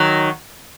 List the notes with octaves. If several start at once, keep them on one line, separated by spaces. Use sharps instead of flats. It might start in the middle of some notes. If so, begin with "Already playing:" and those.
Already playing: D#3 F#3